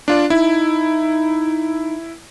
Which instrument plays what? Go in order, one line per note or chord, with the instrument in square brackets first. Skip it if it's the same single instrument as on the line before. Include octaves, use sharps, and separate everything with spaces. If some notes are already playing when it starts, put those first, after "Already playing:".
[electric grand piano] D4 F4 D5
[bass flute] D#4 [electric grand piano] E4